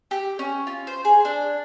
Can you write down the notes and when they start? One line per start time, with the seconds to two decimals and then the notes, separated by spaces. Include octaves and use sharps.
0.11 G4
0.39 C#4
0.67 F4
0.87 C5
1.05 G#4
1.25 D4